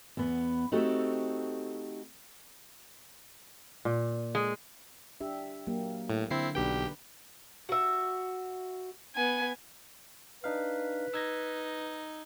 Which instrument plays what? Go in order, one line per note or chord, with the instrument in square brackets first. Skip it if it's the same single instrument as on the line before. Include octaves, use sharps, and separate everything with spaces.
[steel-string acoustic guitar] E2 B3
A3 C4 D#4 F#4 G4 A4
[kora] A#2
[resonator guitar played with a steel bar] G#3
[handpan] D4 G4 E5
F#3 A#3 G4
[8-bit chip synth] A2
[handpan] D3 [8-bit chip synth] C4 E4 C7
[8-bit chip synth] B1 G4 G5 [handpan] D4 B4
[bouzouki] F#4 E5
[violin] B3 G#5
[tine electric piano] D4 D#4 F5 [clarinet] B4
[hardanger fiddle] D#4 [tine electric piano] E6 G#6 A#6